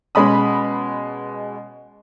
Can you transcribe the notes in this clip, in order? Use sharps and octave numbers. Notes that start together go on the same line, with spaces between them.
B2 G#3 C#4 B5 D#6